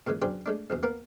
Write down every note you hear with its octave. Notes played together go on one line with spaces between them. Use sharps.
A#2 C#3 E3 G#3
F#2 B2 D4 G#4 C5 G5
G#3 A3 D4
A#1 E2 B2
A#3 B3 A#4